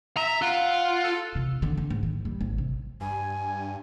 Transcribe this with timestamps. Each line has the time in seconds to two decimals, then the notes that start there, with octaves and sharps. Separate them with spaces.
0.17 E5 A#5
0.42 F4 F#5
1.04 A4
1.35 C3
1.62 D3
1.77 D3
1.90 G#2
2.03 D#3
2.25 G3
2.41 G#1
2.58 C3
3.01 G2 G#5